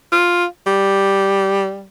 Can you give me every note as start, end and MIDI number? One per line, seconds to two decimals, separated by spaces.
0.12 0.46 65
0.67 1.86 55